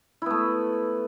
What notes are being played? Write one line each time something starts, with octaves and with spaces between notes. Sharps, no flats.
A3 B3 E4